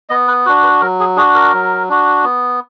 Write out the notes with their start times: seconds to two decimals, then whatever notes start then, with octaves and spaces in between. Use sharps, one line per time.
0.09 B3 D#5
0.28 B4
0.45 D4 F#4 B4
0.63 B4
0.81 F#3 A#4
1.00 G#4
1.16 D4 F#4 G#4
1.35 A#4
1.53 F#3
1.89 D4 F#4
2.24 B3